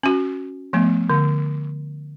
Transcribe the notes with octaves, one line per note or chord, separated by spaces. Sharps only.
C#4 F#4
F3 A3 B3
D3